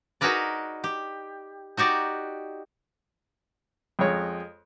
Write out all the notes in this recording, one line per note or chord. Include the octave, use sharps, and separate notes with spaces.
D#4 F#4 G#4 A#4 B4 D5
G4
D#4 F#4 G4 D5
F2 G#3 C#5